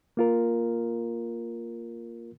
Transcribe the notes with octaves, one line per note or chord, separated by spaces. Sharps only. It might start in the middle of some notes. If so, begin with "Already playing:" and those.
A#3 F4 A#4